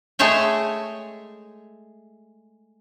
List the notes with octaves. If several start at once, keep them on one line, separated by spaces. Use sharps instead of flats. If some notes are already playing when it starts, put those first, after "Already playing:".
G#3 A3 G#4 C#5 E5 G5